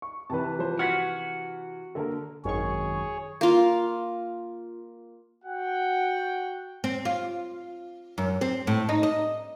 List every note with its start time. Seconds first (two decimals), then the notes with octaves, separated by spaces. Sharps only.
0.02 C#6
0.30 C3 E3 B4 A5
0.59 F3 C5
0.79 F#4 F6 G#6 B6
1.95 D3 A#3 A4 A#4
2.45 G#1 F#2 D#3 G#4 C#5 C#6
3.41 A#3 F4
5.44 F#4 F#5 G5
6.84 C4
7.05 F4
8.18 F#2
8.41 C4
8.67 A2
8.89 D#4
9.03 D#5